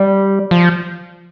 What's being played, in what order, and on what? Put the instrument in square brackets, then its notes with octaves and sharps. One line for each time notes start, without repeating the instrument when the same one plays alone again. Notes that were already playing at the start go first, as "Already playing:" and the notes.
Already playing: [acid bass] G3
F3